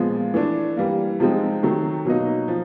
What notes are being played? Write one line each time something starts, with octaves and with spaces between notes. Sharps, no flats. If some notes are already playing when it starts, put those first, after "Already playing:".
Already playing: A#2 F3 G#3 B3
E3 A3 D4
E3 G3 A#3
C3 F3 G#3 C4 D#4
C3 D#3 F#3 A3
B2 F#3 A#3 D#4
F3